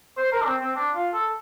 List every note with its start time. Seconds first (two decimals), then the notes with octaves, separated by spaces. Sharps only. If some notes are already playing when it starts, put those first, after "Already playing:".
0.17 C5
0.32 A#4
0.42 D4
0.46 C4
0.61 C4
0.76 D4
0.95 F4
1.14 A4